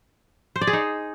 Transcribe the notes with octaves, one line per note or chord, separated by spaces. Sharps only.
C5
D5
G#4
D#4